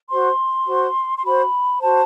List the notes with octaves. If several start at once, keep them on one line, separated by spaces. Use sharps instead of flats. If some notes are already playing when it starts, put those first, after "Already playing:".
F#4 C5 C6
F#4 C5
C6
F#4 C5 B5
F#4 C5 A5